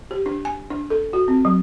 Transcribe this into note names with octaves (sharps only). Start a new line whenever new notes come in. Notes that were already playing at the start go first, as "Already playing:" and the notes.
G4
D4
G#5
D4
A4
F#4
C4
F#3